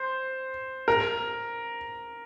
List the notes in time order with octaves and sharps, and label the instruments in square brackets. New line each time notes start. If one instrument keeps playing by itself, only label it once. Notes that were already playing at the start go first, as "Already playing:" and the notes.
Already playing: [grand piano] C5
A#4